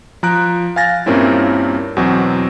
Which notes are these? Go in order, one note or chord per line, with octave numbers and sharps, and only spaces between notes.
F3 A#5 F#6 D7
F5 G#5 A6 A#6
G2 A#2 A#3 C4 C#4 E4
E2 B2 F#3 C4